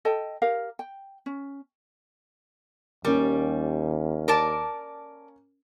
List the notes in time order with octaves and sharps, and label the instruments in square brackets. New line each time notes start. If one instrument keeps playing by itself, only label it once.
[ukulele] A4 D#5 G5 A5
G4 A#4 F5
G5
C#4
[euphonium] D#2 [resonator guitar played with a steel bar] G3 [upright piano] A#3 C#4
[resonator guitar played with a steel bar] A#4 D5 A5